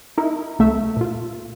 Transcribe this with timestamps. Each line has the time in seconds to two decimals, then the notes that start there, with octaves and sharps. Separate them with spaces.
0.17 D#4 E4 A#4
0.59 C2 A3 E5
0.96 A#2 F4